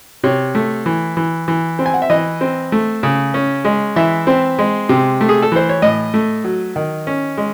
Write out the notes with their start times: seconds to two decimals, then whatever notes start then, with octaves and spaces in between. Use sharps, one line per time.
0.24 C3 C#5
0.55 A3
0.86 E3
1.17 E3
1.48 E3
1.79 C4
1.86 G#5
1.94 F#5
2.02 E5
2.10 E3 D#5
2.41 C4
2.72 A3
3.03 C#3
3.34 C#4
3.65 G#3
3.96 E3 E5
4.27 C4
4.59 G#3
4.89 C3
5.21 A3
5.29 G#4
5.42 A4
5.52 E3 C5
5.69 C#5
5.82 A2 D#5
6.14 A3
6.44 F#3
6.76 D#3
7.07 C#4
7.38 G#3